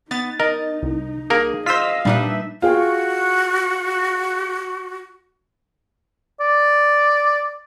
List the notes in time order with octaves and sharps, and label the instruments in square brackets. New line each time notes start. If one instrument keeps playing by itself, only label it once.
[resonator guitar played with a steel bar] B3 [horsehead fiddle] D#4 [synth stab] A6
[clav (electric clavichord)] A#4 [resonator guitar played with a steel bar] D#5
[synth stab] C2
[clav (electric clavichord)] A#3 A#4 [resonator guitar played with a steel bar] G#4
[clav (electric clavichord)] F4 C5 [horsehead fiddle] D#5 F5 [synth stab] E6 B6
[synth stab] A#2 G3 [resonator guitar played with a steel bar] D4 D#4 B4 [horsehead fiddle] E5
[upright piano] F4 G#4 G5 [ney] F#4
[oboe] D5